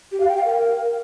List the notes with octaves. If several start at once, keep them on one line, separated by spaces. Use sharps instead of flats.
G4
F5
G5
F5
A#4